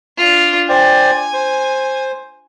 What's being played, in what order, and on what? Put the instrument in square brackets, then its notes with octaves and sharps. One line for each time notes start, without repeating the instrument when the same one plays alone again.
[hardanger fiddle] D4 F4
[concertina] C5 D5 G5 [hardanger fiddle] G#5
[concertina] C5